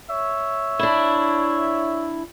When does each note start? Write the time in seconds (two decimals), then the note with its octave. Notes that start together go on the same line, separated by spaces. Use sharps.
0.11 C#5 E5
0.79 D4 E4